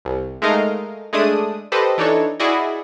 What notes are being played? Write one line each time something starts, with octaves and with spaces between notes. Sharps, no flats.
C2
G#3 A3 D#4 A#4 D#5 F5
G#3 A3 D4 D#6
G4 A4 B4 C5 D#5
E3 D4 D#4 A4 C#5
E4 F#4 G#4 D5 D#5